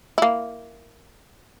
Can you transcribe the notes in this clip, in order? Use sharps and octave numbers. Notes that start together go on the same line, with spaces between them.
A#3 E4